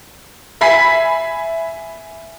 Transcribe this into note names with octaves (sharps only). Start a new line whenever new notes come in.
E5 G#5 B5 B6 C7